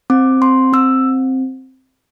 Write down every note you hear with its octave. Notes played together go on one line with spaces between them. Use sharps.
C4 D6
C4 C6
C4 E6